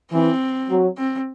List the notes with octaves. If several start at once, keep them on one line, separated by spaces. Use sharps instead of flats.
E3 C4
F#3
C4